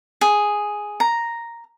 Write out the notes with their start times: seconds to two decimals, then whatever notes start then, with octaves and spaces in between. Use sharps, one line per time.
0.21 G#4
1.00 A#5